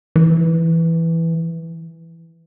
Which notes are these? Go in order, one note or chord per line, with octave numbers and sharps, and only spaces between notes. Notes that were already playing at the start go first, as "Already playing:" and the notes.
E3